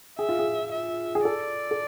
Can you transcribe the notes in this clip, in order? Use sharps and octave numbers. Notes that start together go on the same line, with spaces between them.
G#4 E5
F4
G#4
E5
G#4
A4 D5
A4